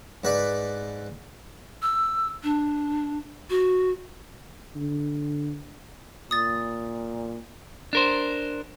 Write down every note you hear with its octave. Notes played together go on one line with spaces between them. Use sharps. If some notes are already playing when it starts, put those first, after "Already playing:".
G#2 B4 D5
E6
D4
F#4
D3
A#2 D#6 A6
D4 A#4 C5